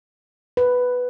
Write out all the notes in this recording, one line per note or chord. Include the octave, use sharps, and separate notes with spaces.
B4